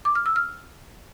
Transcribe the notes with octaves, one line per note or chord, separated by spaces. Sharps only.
D6
F6
E6
F6